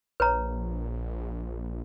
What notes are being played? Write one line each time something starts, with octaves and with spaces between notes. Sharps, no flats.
A#1 B4 C#5 A#5